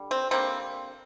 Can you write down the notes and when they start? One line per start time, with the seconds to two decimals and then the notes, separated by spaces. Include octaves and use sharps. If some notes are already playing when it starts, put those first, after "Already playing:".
Already playing: D3 G3
0.11 C4
0.31 D3 G3 A#3 C4